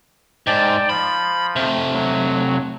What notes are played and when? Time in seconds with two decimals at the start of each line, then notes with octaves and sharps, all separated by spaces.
0.47 G#2 D5 G5 A5
0.90 F3 B5
1.56 C3 A3
1.94 F#3